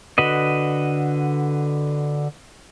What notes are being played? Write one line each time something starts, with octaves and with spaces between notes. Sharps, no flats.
D3 F#4 B4 D#5